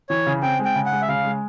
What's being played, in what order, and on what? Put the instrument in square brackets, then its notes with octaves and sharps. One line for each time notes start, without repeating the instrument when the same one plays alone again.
[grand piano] E3 [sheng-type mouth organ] C#5
[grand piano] C#3
[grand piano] C4 [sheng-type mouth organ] G5
[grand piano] G#3
[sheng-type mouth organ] G5
[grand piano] C#3
[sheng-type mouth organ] F#5
[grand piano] G#3
[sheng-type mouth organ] E5
[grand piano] C#3 [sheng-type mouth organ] F5
[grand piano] G#3